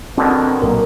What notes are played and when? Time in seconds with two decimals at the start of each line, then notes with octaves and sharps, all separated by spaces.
0.17 B2 D3 D#3 C4
0.62 B1 A#2 F#3 A#4